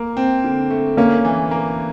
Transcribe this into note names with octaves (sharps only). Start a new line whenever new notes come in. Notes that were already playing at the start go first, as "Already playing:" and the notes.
Already playing: A#3
C4
D3
A3
A#3 C#4
E3
A#3